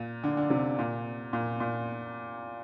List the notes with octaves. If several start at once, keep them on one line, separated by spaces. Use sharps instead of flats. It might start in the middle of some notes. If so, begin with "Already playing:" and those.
Already playing: A#2
D3
D3
C3
A#2
A#2
A#2